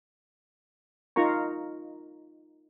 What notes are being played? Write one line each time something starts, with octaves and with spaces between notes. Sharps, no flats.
D#4 F4 A#4 A#5 C#6